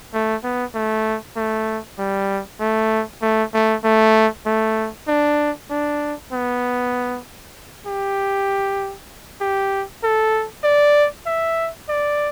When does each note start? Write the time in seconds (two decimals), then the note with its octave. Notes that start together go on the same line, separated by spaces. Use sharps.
0.14 A3
0.44 B3
0.74 A3
1.36 A3
1.98 G3
2.60 A3
3.22 A3
3.54 A3
3.84 A3
4.46 A3
5.08 D4
5.70 D4
6.32 B3
7.87 G4
9.41 G4
10.04 A4
10.64 D5
11.26 E5
11.89 D5